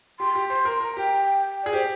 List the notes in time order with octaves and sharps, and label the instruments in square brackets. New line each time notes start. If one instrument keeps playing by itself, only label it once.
[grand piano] G4 [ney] C6
[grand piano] G4
[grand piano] C5 [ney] C6
[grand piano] A#4
[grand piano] A#4 [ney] A#5
[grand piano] G4 [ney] G5
[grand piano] G#4 [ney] D5
[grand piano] G4 [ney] C5